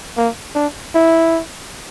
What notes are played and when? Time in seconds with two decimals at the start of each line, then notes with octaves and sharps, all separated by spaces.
0.17 A#3
0.55 D4
0.95 E4